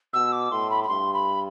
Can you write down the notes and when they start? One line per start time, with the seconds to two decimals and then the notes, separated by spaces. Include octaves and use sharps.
0.13 B2 E6
0.32 D6
0.51 A2 C6
0.70 B5
0.83 B5
0.88 G2 C6
1.13 B5